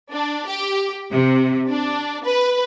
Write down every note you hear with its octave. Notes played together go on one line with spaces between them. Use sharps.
D4
G4
C3
D4
B4